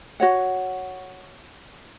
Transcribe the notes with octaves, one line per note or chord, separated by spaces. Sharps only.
F#4 C#5 F#5